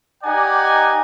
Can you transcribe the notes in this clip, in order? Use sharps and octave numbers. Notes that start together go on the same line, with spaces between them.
D#4 G4 D5 F#5 G#5